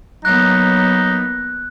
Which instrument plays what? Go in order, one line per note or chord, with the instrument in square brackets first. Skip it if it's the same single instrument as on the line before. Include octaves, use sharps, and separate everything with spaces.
[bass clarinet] F#3 [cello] A#3 B3 [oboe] D#4 [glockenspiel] F#6